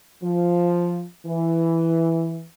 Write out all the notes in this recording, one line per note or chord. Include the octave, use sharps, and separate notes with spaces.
F3
E3